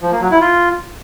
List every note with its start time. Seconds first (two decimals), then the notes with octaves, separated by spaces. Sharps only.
0.01 F3
0.11 A#3
0.21 F#3
0.31 E4
0.41 F4